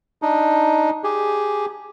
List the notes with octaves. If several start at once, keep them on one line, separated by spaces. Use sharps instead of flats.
D4 D#4
G4 G#4